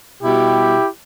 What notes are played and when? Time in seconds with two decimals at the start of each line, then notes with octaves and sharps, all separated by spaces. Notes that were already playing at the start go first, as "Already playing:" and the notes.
0.22 B2 G3 E4 G4